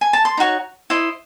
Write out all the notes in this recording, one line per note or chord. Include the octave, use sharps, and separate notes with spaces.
G#5
A5
C6
D#4 F#4 C#5
E4 C5 D#5